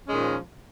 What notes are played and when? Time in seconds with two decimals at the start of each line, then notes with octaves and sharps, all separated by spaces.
0.05 C#4
0.08 G#3
0.11 A#2
0.14 D#3
0.17 F3